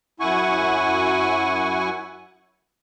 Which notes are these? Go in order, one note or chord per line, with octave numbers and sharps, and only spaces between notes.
F#2 E4 F#5 G#5 C#6